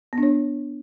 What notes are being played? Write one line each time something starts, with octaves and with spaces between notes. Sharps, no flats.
B3
D4
C#5